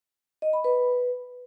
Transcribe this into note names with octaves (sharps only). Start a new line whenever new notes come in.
D#5
B5
B4